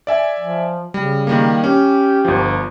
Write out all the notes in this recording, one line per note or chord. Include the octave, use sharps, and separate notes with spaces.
D5 E5 G#5
F3
C#3 G3
D#3 G3 A#3
C#4 G4
G1 F3